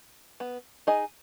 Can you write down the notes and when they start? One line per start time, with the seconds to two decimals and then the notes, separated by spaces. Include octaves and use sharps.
0.40 B3
0.87 D#4 G#4 D#5